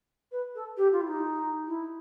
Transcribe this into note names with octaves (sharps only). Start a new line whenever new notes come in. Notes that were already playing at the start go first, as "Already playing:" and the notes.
B4
A4
G4
F4
E4
D#4
E4